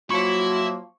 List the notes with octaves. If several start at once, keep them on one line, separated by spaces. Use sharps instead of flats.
F3 F#3 A#3 E4 F#4 E5 C#6